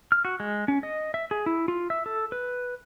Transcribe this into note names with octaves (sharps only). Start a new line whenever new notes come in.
F6
F#4
G#3
C#4
D#5
E5
G#4
E4
F4
E5
A4
B4